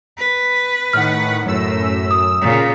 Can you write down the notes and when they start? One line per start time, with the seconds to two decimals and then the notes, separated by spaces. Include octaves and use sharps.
0.18 B4
0.93 A2 D#3 F#5 F6
1.45 F#2 A2 E6
2.11 D#6
2.41 A#2 C#3